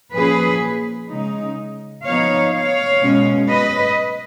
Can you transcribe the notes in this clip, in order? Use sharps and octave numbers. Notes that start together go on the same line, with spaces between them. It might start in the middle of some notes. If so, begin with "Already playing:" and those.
A#2 F3 A#3 C#4 G#4 B4
C#3 G#3 D#4
F3 B3 D#4 C#5 F5
C#5 F5
B2 G#3 C#4
B4 D#5